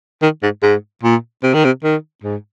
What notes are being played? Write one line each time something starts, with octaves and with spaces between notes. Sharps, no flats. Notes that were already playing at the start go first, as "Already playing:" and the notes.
D#3
G#2
G#2
A#2
C3
D#3
C3
D#3
G#2